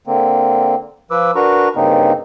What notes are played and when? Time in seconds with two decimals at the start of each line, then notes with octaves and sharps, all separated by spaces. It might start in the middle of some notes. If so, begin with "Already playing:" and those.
0.07 D3 A#3 C4
1.11 F3 B4 D6 E6
1.35 D4 F#4 A#4 B4 A#5 C#6
1.76 G2 C#3 A#3 C4 D#4